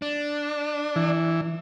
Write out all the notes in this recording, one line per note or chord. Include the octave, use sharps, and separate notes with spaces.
D4
E3